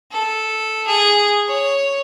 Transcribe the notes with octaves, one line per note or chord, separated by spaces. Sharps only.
A4
G#4
C#5